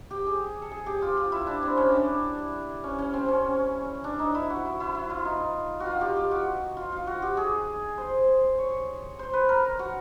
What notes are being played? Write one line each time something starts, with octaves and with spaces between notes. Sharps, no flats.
G4
G#4
A4
G#4
G4
F4
F4
E4
D4
C4
C#4
D4
C#4
C#4
C4
C#4
D4
D#4
E4
F#4
E4
E4
E4
F4
D#4
F#4
F4
G4
G4
F#4
F4
F4
F#4
G4
G#4
C5
C#5
C5
B4
A#4
F#4